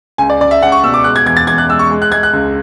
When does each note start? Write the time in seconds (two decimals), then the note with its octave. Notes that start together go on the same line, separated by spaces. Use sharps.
0.18 C#2 G#5
0.29 D5
0.40 C#2 D5
0.51 E5
0.62 C#2 F#5
0.72 C#6
0.83 B2 E6
0.94 D6
1.04 G#3 F#6
1.16 G#6
1.26 E2 G#6
1.37 A6
1.47 E2 G#6
1.58 F#6
1.69 G#3 E6
1.79 C#6
1.90 G#3
2.02 F#6
2.12 G#3 G#6
2.23 F#6
2.33 C#2